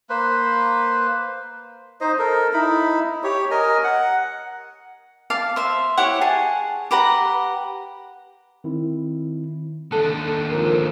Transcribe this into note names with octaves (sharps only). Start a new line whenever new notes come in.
A#3 B4 C5
D#4 C5 D#5
A4 A#4
D#4 E4 B5
G4 C#5
A#4 D#5 G#5
F#5
F5 A5 D6
C5 E5
E4 G4 C#5 F#5
G#4 A5
G4 B4 F#5 A#5
D#3 C4 E4
D#2 D3 A4 F#6
G#1 F3 A#4